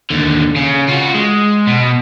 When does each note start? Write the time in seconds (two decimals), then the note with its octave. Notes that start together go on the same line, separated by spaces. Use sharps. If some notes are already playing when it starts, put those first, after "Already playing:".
0.10 D#2 D3
0.56 C#3
0.88 F4 F#4
1.15 G#3
1.67 B2